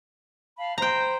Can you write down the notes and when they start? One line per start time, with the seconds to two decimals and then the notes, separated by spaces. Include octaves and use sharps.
0.57 F5 A5 B5
0.78 C5 G5 A#5 B5 G6